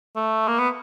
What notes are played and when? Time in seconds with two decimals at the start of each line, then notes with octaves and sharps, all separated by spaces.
0.16 A3
0.48 A#3
0.59 B3